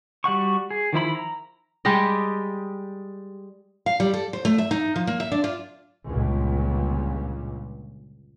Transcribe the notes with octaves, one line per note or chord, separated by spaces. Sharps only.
G3 F#4 F#5 C#6
G#4
D#3 F3 E4 B5
A#5
G3 G#3 G4 D#5
F5
G3
A4
C5
A3
E5
D#4
F3
A#3
E5
D4
F4
G1 C#2 A#2